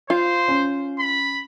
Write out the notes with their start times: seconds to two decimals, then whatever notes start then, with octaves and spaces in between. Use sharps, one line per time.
0.10 F4 C5
0.48 C#4
0.99 B5